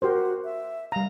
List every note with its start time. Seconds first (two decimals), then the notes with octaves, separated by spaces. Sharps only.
0.02 F#4 G4 A#4 C5
0.44 E5
0.92 G3 F5 A#5